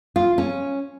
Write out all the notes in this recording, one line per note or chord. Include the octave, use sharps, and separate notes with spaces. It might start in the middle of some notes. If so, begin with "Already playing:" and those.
F4
C#4